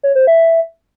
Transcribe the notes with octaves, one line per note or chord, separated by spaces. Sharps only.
C#5
C5
E5